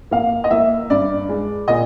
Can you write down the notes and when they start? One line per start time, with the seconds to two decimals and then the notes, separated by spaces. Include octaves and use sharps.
0.11 A#3 F5
0.44 D#5
0.51 A#3 E5
0.90 G2 D5
1.29 G#3
1.68 A#2 D#5